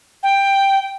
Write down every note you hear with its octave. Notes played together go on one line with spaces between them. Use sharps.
G5